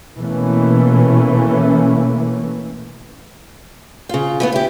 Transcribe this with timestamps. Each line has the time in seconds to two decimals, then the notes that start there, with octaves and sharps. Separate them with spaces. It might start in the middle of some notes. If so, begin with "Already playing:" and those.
0.17 B2 E3 A3 A#3 C#4
4.09 C#3 F4
4.40 E3 A3 B3
4.52 E4 G4